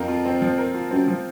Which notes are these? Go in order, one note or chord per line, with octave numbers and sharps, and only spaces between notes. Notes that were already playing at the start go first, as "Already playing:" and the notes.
Already playing: F2 F3 C4 A#4
F4
C4
F3
A#4
F4
F#2 C4
F3